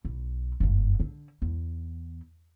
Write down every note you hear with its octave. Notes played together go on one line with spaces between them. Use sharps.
B1
F#1 G2
D3
E2